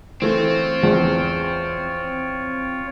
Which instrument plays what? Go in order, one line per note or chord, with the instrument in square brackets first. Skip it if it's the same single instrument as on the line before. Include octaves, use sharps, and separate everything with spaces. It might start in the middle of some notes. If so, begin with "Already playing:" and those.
[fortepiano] E3 A3 [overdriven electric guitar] C4 [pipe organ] F4 C#5
[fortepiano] E2 F3